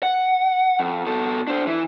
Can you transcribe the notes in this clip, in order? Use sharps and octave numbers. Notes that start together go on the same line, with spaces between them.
F#5
F2
B2 A4
D4 C5
E3